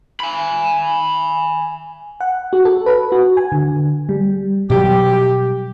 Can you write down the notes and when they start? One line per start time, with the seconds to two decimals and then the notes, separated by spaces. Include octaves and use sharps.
0.20 G#5 B5
2.20 F#5
2.53 F#4
2.65 A4
2.86 B4
3.12 F#4
3.37 G#5
3.52 D3
4.09 G3
4.70 B2 F#3 G3 G4